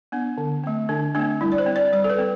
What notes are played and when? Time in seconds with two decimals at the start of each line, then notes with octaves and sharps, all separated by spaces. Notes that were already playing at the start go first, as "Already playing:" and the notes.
0.12 B3 D4
0.38 D3
0.64 A3 C4
0.89 D3 D4
1.15 A3 C4 D4
1.41 G3 E4
1.52 D5
1.58 C5
1.66 C4
1.76 D5
1.92 G3 D5
2.04 A4
2.10 B4
2.19 C4